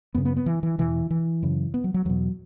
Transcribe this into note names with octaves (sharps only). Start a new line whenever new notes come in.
F#2 C#3 B3
B3
B3
E3
E3
E2 B2 E3
E3
F#2 C#3
B3
F#3
F#3
E2 B2 F#3